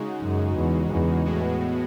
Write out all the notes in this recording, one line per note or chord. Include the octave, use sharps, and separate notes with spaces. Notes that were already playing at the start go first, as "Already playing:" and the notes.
Already playing: C#3 G#3 D#4 F#4
F#2
E2
E2
A2 G#3 B3 F#4